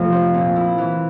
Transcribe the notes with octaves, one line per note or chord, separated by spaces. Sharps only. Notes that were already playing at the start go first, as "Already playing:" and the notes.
Already playing: F2 C3 F3 A3
C4
A#2
E4
E3